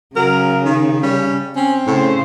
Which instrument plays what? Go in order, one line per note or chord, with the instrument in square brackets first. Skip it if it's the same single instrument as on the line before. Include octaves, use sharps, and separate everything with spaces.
[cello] C#3 [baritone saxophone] F#3 [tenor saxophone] A#4
[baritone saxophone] D#3
[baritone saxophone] G3 [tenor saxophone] C#4
[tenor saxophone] C4 [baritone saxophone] C#4
[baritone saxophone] A2 [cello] C#3 C5